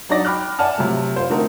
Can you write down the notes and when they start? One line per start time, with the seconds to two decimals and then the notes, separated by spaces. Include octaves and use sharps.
0.09 F#3 D4 D#4 F#4 D5 A#6
0.25 G5 B5 D6 F6 F#6
0.59 D5 E5 F#5 G#5 A5 F6
0.78 C3 F3 F#3 A3
1.16 F4 C5
1.30 D3 A3 C4 D#4 F#4 A#4